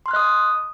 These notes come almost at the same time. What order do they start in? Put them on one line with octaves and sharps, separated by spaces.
C6 F6 F#6 D#5 D#6